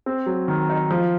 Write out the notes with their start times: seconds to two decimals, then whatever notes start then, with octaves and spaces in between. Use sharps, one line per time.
0.06 C4
0.26 F#3
0.48 D#3
0.69 D#4
0.91 F3